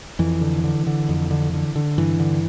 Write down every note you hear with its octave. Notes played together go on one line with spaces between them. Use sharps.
F2 E3
D3
D3
D3
F2
D3
D3
D3
G2 E3
D3